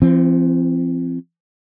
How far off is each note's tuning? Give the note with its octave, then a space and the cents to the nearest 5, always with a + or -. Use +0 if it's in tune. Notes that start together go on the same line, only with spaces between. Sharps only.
F3 -45 C4 +0